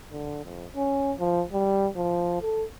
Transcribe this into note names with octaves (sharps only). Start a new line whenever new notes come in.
D3
F2
C#4
F3
G3
F3
A4